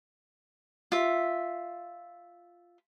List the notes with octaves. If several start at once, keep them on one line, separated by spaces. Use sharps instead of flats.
F4 E5